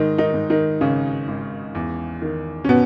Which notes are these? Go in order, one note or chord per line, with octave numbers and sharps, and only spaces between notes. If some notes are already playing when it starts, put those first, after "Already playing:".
Already playing: G#2 D#3 D#4
D#3 D#4
G#2
D#3 D#4
G#1 C#3 C#4
G#1
E2
D#3
C#4
B2 B3